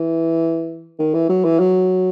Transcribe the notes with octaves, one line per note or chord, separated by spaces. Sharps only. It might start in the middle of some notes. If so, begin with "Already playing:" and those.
Already playing: E3
D#3
E3
F#3
E3
F#3